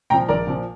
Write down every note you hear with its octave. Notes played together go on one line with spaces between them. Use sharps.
A#2 F3 G5 A#5
A#1 A#4 D5
A#2 F3